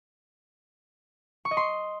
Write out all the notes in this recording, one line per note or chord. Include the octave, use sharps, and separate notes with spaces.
C#6
D#5
C6